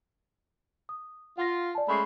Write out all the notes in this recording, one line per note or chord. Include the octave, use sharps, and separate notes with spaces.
D#6
F4 F#5 A#6
D5 G#5 A5
G#3 A3 C#4 B5 C#6 C7